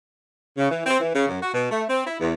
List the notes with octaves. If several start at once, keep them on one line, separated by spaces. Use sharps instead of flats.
C#3
E3
C4
E3
C#3
F#2
F#4
B2
A3
C4
E4
E2